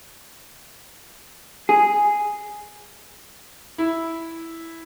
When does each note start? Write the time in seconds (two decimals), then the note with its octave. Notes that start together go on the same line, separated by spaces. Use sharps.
1.69 G#4
3.78 E4